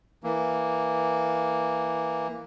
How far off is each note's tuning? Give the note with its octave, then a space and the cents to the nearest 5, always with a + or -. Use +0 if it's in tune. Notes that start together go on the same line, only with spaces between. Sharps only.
E3 +0 A#3 +0